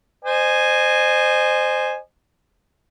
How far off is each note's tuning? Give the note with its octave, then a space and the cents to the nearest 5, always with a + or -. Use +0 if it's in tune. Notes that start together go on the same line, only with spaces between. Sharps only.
C5 -5 D#5 -35 G#5 +0